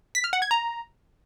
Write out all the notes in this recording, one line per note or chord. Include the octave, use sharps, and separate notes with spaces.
B6
F6
F#5
G#6
A#5